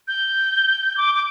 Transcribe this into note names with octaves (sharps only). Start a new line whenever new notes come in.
G6
D6
D6